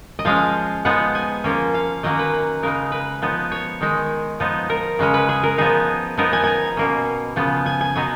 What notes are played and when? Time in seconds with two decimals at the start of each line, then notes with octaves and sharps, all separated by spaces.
0.19 D#5
0.25 F3 G#3 C#4 F5
0.85 F3 G#3 B3 D#4 F#5
1.15 G#5
1.44 F3 A#3 C#4
1.74 F5
2.03 D#3 F#3 A#3 C#4 D#5
2.19 B4
2.63 C#3 G#3 D#4 A#4
2.92 B4
3.22 F3 B3 D#4
3.52 C#5
3.81 D#3 G#3 D#4
4.40 F3 B3 D#4
4.70 A#4
4.99 C#3 G#3 C#4
5.14 B4
5.29 G#4
5.43 A#4
5.58 F3 B3 D#4 G#4
6.17 F3 B3 D#4 A#4
6.33 G#5
6.44 G#5 A#5
6.77 B2 A#3 C#4
7.36 C#3 F3 B3
7.66 G#5
7.81 G#5
7.95 B2 F#3 B3 D#4 G#5